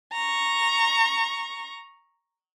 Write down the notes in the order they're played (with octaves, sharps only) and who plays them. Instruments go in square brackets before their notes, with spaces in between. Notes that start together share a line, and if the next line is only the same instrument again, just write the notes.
[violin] A#5 C#6